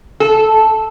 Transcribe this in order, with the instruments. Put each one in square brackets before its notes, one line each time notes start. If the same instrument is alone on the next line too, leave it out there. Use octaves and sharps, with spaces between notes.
[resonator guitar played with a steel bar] A4